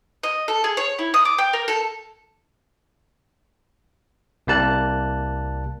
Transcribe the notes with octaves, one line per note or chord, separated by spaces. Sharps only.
D#5
A4
G#4
C#5
E4
D#6
D6
G5
A#4
A4
C2 G3 A#3 A5 F#6